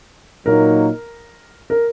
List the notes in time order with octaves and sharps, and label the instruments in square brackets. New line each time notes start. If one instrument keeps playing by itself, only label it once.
[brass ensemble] A#2 F#3 A#3 D#4 [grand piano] A#4
[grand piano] A#4